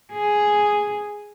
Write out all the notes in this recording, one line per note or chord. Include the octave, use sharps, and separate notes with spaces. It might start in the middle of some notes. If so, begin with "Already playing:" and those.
G#4